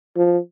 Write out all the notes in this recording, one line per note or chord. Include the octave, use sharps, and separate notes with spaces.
F3